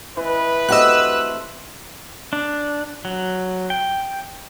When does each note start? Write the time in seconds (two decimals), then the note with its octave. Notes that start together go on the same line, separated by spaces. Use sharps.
0.17 E3 B4 D#5
0.69 A3 C4 F#4 G4 D#5 E6 F#6
2.33 D4
3.05 F#3
3.70 G5